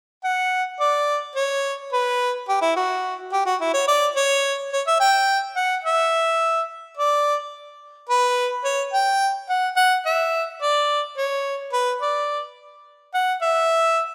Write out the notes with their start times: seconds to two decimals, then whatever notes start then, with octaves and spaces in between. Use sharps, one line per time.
0.24 F#5
0.80 D5
1.35 C#5
1.93 B4
2.49 G4
2.62 E4
2.76 F#4
3.33 G4
3.46 F#4
3.61 E4
3.74 C#5
3.88 D5
4.16 C#5
4.72 C#5
4.87 E5
5.00 G5
5.56 F#5
5.84 E5
6.97 D5
8.09 B4
8.64 C#5
8.93 G5
9.49 F#5
9.77 F#5
10.06 E5
10.62 D5
11.17 C#5
11.73 B4
12.01 D5
13.14 F#5
13.42 E5